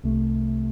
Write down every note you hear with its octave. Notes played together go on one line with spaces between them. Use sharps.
C2 C3 A3